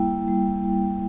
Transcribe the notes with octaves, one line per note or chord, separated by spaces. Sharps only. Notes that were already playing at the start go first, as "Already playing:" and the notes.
Already playing: G3 A#3 E4 G5
G3